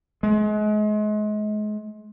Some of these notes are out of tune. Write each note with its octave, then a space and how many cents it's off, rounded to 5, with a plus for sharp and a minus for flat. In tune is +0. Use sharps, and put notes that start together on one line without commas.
G#3 +35